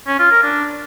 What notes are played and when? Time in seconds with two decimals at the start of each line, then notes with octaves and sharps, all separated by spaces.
0.07 C#4
0.19 F4
0.31 A#4
0.43 D4